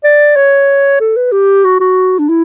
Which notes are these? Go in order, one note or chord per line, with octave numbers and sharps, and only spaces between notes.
D5
C#5
A4
B4
G4
F#4
F#4
D4
E4